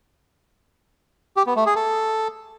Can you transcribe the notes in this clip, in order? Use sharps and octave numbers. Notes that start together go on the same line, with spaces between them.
G4
B3
A3
G#4
A4